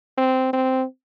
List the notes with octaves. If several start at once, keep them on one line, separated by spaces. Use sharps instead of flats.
C4
C4